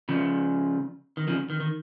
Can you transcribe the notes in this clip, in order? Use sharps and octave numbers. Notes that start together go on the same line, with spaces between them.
C#3 F3
D#3
C#3 F3
D#3
D#3